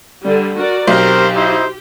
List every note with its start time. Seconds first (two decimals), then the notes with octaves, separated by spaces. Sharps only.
0.23 D3 G3
0.58 F#4 A#4 D5
0.88 B1 C4 G4 A#4 C5
1.36 D#4 E4 C5